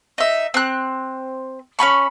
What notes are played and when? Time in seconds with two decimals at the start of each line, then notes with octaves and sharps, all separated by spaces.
0.18 D#4 E5
0.54 C4 F#6
1.79 C#4 F4 B5 C#6